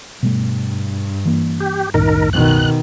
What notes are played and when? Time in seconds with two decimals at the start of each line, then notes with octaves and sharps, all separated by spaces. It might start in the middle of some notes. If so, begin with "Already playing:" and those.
0.23 G2 B2 G3 A3
1.25 E3 A#3
1.60 G4
1.94 C2 F#2 A2 D#3 A#4
2.33 B2 D#3 F#6